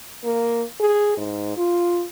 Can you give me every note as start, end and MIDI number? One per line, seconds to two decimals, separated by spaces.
0.24 0.64 58
0.80 1.16 68
1.17 1.55 44
1.57 2.05 65